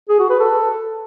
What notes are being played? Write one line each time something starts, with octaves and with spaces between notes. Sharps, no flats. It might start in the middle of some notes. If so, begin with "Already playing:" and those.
G#4
F#4
B4
A4